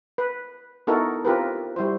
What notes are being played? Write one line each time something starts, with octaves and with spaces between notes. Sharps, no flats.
B4
B3 D#4 E4 F#4 A4 A#4
C4 F4 G4 A#4 B4
G3 E4 F#4 C5